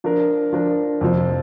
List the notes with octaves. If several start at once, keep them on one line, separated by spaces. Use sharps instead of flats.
F3 D4 A#4
F3 D4 A#4
F2 C3 F3